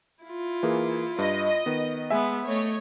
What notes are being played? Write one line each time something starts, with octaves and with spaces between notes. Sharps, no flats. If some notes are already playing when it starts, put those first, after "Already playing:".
E4 F4
E3 A#3 G#4
G2 D#5
D#3 B3
G#3 B3 E5 G#5
A3 C#5 D#5